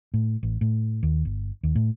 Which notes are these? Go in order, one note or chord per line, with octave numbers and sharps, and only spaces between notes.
A2
A1
A2
D#2
G1
D#2
A2